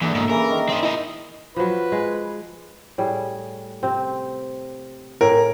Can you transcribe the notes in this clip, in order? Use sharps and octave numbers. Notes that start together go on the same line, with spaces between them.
E2 A#2 D3 E5
G#2 B2
C#3 E3 A#4
D#3
C4 D#5
E4 D#5
F3 F#3 B4
G#3
A2 G3 G#4
C3 C4
A2 G#4 A#4